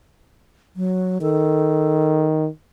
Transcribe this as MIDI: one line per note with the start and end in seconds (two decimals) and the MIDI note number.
0.76 1.18 54
1.22 2.48 51
1.22 2.26 69